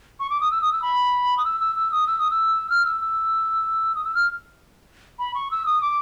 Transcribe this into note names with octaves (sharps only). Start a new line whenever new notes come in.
C#6
D6
D#6
E6
D#6
E6
B5
D#6
E6
E6
E6
D#6
E6
D#6
E6
F6
E6
E6
D#6
E6
F6
B5
C#6
E6
D#6
D6